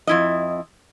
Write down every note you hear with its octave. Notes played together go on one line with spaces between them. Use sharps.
F2 E4 D#5